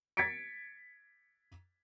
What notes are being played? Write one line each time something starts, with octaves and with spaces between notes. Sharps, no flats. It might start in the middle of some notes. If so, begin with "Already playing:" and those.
G#6 A6 B6 C#7 D7